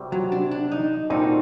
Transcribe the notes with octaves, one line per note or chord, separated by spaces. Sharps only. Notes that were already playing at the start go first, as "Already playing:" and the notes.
Already playing: C3 G3 C4 F#4
F#3
D4
D4
D#4
A#2 G3 C4 D#4 F#4 A4